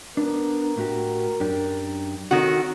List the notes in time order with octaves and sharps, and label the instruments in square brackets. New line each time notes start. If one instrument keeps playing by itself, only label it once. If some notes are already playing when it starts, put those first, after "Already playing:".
[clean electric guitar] B3 D4 [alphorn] A#4
[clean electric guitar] A2 F#4 G4
F#2 D4 G4
[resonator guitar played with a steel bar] D#3 F#4 [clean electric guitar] C4 A4 C#5